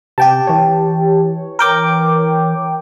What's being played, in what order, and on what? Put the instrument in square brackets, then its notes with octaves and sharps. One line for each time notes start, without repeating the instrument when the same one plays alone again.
[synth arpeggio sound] C3 [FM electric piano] G4 G5 A5
[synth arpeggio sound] E3 C#5
[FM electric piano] A#4 G5 D6